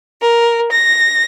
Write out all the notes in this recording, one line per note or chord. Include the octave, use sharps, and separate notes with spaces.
A#4
A#6